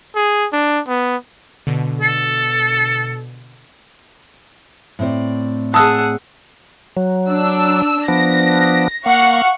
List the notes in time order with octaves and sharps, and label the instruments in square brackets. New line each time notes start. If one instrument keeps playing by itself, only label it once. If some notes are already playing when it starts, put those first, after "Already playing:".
[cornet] G#4
D4
B3
[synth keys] B2 D3
[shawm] A4
[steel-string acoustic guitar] A2 C4 D5
[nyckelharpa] G#4 F#5 [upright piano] A5 [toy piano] D#6 E6
[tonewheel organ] F#3
[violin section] D4 E6
[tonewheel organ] F3 B3 D4 [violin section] A#6
[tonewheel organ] A#3 [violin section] F5 F#5 C#6